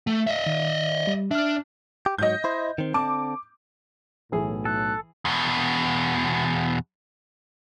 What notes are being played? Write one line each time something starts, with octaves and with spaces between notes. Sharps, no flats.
A3
D#5 E5
D#3
G3
D4 E5 F6
G4
G#2 F#3 D#5 G6
E4 C5
D#3 C4
D3 C4 A5 D6
B1 A2 E3 G#4
A4 F#6
E2 B2